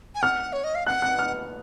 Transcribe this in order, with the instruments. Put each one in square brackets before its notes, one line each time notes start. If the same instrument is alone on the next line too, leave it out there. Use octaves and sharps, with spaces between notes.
[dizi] G#5
[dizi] F#5 [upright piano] F6
[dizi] C#5
D#5
F5
[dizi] F#5 [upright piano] F#6
[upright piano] F#6
F6